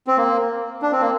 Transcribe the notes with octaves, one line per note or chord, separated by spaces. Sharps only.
C4
A#3
D4
C4
A#3